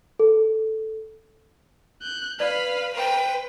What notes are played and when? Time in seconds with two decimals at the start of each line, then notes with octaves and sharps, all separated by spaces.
0.19 A4
2.02 F#6 G6
2.40 B4 D5 F5 B5
2.93 B4 C5 G5